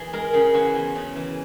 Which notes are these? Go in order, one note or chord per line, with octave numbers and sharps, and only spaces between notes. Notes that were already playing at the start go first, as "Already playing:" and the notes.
Already playing: E3 G#4
G#3 A#4
C#3 G#4
E3 F#4
E2
C#3
E3